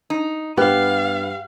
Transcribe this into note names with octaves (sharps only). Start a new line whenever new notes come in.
D#4
G2 B3 G4 B4 F5 F#6